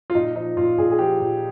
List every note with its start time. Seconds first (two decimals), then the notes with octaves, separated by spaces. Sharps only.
0.10 F4
0.15 A#2 D#4
0.35 F3 D#4
0.57 A#2 F4
0.78 A#2 G#4
0.91 G#4
0.99 F3 G4
1.20 A#2